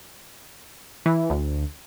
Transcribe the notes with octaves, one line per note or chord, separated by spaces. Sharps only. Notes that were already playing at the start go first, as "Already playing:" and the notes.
E3
D2